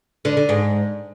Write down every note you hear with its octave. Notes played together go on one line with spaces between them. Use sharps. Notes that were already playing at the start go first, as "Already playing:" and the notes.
D3
D3
G#2